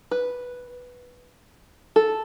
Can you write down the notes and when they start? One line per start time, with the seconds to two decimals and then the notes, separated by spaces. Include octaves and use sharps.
0.11 B4
1.96 A4